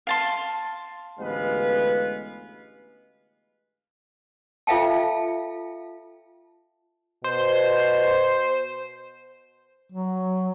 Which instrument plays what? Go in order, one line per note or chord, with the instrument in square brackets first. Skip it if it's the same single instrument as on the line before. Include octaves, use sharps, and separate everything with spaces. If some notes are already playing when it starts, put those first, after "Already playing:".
[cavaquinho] F5 A5 C6
[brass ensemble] A1 D2 G#3 B3 B4 F5
[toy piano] F4 A4 E5 F5 G5 A5
[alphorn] B2 [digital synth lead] C5
[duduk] F#3